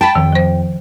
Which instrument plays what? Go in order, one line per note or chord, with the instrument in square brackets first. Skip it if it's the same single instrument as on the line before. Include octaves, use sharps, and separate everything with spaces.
[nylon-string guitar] G5 [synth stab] A5 B5
[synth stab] F2 [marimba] D#3
[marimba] F3 C5